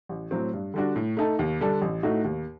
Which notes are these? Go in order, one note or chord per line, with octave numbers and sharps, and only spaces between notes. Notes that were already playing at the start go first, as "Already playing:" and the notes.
A1
A2 F#3 C4
G2
D3 G3 D4 F#4
A2
A3 D#4 A4
D#2
D3 G3 D4 A4
A1
A2 A3 D#4 F#4
D#2